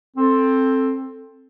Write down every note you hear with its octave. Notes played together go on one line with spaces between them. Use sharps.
C4 A4